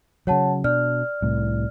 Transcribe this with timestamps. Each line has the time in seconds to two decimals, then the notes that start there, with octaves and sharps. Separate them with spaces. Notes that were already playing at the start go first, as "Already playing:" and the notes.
0.27 C#3 F#3 C#5 F#5 A5
0.64 B2 D4 D5 F6
1.22 C2 A2